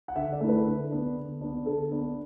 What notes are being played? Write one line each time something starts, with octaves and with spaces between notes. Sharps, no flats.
F#5
D3 E5
D5
A3 E4
B4
D3
B3 D4
D3
B3 D4
D3 A4
B3 D4